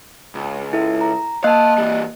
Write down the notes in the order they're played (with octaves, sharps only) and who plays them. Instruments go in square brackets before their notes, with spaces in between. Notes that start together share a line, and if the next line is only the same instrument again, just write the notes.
[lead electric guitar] C#2
[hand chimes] E4 A4 E5
A#5
[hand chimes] A#3 D#5 F#6 [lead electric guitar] F5 A5
[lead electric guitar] E3 G3